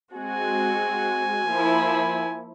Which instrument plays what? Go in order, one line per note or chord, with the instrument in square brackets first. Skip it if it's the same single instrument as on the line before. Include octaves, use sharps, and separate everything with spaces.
[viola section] G#3 C4 F#4 [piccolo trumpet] G#5
[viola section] F3 A#3 E4